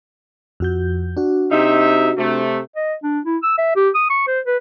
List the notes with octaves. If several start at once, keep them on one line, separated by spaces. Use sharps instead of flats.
F2 F#4 G6
D4 F#4
C3 D#4 E5
C3 A3
D#5
D4
E4
E6
E5
G4
D#6
C#6
C5
B4